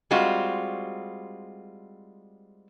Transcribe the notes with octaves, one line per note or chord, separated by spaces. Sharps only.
G3 G#3 C4 F4 F#4